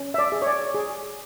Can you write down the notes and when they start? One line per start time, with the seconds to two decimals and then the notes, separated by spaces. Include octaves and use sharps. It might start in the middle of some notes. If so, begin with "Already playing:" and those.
Already playing: C#4
0.14 E5
0.18 D5
0.32 G#4
0.42 C#5
0.47 D5
0.74 G#4